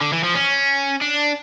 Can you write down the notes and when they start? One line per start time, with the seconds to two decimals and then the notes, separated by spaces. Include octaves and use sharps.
0.01 D3
0.13 E3
0.24 F3
0.35 C#4
1.01 D4